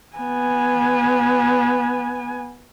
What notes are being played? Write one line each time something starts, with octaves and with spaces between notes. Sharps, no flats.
B3 G#5